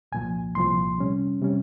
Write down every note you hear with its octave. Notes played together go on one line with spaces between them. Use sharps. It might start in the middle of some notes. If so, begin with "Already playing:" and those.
C2 A#2 F3 G#5
C2 A#2 F3 C6
C3 G3 C#4
C3 G3 C#4